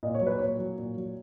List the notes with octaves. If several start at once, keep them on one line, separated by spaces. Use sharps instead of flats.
A#2 D#5
C#5
F#3
B4
A#2 C#5
F#3
A#2
F#3